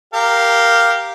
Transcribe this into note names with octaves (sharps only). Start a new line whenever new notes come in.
G4 A#4 F5